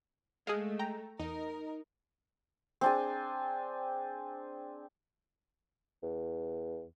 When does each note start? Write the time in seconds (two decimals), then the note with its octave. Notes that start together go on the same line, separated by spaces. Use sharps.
0.47 G#3 A3 G#4 D#5 F5
0.79 G5 A#5
1.19 E2 D#4 A#4
2.81 C4 D4 G#4
6.03 E2